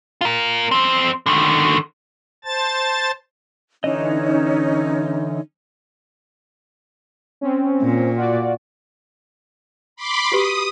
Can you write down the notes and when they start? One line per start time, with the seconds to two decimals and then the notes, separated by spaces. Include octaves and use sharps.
0.21 F4 A#4
0.71 F2 C4
1.26 D3 D#3
2.45 C5 A5 A6
3.84 D3 E3 C#4 D#4 D#5
7.41 C4 C#4
7.82 A#2
8.16 F4 F#4 D5
9.96 B5 C6 D6
10.32 F#4 G4 B4 D#6